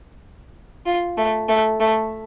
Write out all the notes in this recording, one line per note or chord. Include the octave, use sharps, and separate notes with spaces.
F4
A3
A3
A3